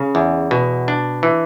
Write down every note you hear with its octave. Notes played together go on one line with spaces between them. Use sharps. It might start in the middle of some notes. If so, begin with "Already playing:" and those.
Already playing: C#3
E2
B2
D4
E3